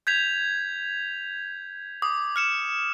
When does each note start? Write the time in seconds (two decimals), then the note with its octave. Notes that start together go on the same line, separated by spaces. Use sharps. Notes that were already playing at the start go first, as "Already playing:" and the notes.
0.07 G6 G#6 B6 F7
2.02 D6 D#6
2.36 F6 C#7 E7